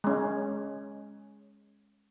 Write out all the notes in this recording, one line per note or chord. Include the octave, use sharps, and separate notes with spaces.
G#3 C#4